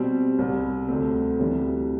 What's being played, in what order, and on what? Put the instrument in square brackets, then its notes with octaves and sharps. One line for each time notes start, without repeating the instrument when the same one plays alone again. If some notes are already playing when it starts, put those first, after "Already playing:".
Already playing: [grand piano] B2 G3 C4
C2 C3 G3
D2 D3 A3 C4
D2 C3 E3 G3